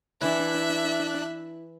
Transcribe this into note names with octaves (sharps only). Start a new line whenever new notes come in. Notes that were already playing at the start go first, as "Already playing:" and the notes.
E3 D4 E4 E5 F#6